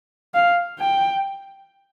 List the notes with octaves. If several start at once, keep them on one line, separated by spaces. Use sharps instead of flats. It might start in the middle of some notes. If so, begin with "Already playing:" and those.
F5
G5